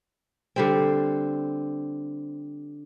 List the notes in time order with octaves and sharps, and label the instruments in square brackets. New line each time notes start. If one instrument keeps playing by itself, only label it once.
[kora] D3 G3 C4